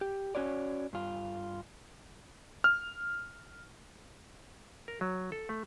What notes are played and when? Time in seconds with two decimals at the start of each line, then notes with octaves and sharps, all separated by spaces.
0.01 G4
0.35 C#4 F#4 C#5 D5
0.93 G2 F4
2.64 F6
4.88 A#4
5.01 F#3
5.32 A4
5.49 A3